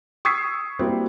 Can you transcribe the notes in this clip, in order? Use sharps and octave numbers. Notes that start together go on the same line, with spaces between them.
C#6 D#6 E6 G#6 B6 C7
G3 A#3 C4 E4 F#4